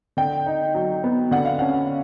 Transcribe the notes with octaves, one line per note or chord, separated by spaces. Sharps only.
D3 G5
D#4
F#3
B3
D3 F#5
F5
C#4 F#5